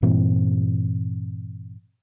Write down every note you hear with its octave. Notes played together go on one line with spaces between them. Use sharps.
G2 A#2 E3 C4